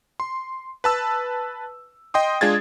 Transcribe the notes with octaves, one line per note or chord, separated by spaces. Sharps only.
C6
B4 A5 E6
D#5 G5 C6 D#6
G#3 D4 F4 G#4 G#6 A6